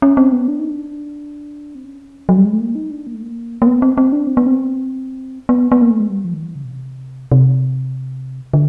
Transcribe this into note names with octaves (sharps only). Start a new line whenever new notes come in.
C#4
C4
B3
D4
D#4
D4
C4
C#4
F#3
G3
G#3
A3
A#3
D#4
D4
A#3
A3
A#3
A#3
B3
C4
C4
D4
C4
B3
C4
B3
B3
A#3
A3
G#3
G3
F3
D#3
E3
C#3
B2
C3
C3
D3